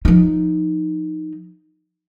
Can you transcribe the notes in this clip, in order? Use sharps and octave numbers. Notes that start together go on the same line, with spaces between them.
F3 D#4